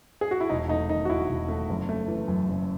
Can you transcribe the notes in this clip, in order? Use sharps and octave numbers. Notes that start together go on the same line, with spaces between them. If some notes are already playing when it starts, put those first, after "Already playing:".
G#4
F#4
E4
E1 D#4
A3 D#4
D#3 D#4
F#4
D#2 E4
E1
A3
F#1
A3
E3
F#2
F#1